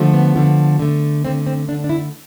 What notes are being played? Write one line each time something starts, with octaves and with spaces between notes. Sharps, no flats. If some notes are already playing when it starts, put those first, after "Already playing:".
Already playing: D3 F3 A3
B3
D3 F3 A3
D3 A3
D3 A3 C4
C4
D3 A3 D4
D4
E4